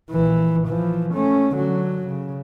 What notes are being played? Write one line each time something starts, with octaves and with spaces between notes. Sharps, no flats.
A#1 E3
E3 F3
A3 C#4
D3 F#3
C#3